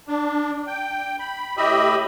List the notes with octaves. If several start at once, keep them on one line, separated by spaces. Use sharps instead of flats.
D4
G5
B5
A2 G4 D#5 E5 B5